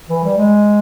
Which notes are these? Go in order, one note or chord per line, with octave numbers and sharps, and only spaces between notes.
E3
G3
G#3